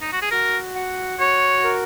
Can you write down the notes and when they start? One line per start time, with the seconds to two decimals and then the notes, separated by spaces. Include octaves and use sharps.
0.01 D#4
0.12 F#4
0.22 G#4
0.31 F#4 A#4
0.75 F#5
1.19 F#4 C#5
1.64 A#4